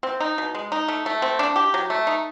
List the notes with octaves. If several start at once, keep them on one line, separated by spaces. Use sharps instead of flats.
C4
D#4
B2
G#3
D#4
A3
A3
C4
D4
G4
F#3
A3
D#4